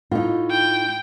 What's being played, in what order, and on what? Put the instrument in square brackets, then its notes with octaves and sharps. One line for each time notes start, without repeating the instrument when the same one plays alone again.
[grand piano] A2 [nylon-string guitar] D#4 F4
[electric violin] G5